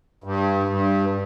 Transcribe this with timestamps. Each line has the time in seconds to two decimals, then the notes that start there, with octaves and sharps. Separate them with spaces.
0.24 G2
0.68 G2